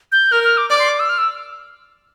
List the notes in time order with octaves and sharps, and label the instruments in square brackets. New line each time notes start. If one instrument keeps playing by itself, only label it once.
[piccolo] G6
[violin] A#4 [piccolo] F6
[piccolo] F6
D6
[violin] D5 [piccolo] D6
[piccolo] C6
D6
E6
F6
E6